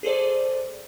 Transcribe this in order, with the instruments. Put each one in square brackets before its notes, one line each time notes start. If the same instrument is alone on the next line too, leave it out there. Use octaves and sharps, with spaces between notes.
[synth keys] G#4 A4 C5 D5